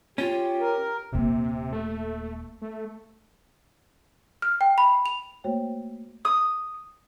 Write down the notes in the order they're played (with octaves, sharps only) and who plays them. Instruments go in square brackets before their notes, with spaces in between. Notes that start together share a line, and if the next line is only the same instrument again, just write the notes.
[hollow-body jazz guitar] C#4 [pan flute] F4 [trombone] G4
[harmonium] A#4
[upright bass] D#1 A#3 [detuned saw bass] C3
[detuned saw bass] A3
A3
[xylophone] F6
G5
B5
F7
[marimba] A3 A#3 F#4 C5 C#5 G5
[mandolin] D#6